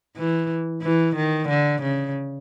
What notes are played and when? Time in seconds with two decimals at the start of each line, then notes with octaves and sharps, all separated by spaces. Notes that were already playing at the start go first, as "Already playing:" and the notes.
0.16 E3
0.82 E3
1.16 D#3
1.49 D3
1.82 C#3